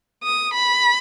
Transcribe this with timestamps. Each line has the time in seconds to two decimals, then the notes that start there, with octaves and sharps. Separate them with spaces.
0.23 D#6
0.54 B5